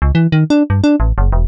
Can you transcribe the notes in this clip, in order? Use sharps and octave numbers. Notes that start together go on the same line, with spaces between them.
C#2
E3
D#3
D4
G2
D4
A1
F#1
E1